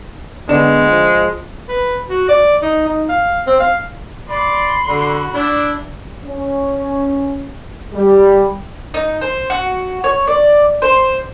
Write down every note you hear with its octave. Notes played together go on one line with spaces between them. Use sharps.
D3 G#3 B3 D5 E7
F3
B4
F#4
D5
D#4
D#4
F5
C4
F5
D5 B5 C6
D3 F#4
D4 E4
C#4
G3
D#4
C5
F#4
C#5
D5
C5